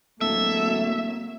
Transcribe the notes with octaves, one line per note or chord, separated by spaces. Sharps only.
D1 F#3 G#3 A#3 A4 E5